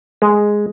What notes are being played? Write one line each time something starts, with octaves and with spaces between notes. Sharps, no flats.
G#3